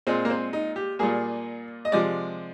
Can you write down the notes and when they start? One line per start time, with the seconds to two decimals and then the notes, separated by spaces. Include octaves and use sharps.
0.07 A#2 G#3 C4
0.25 A#3
0.30 C4
0.53 D#4
0.76 G4
0.99 A#2 G3 A#3 G#4
1.85 D#5
1.92 C3 F3 G#3 D5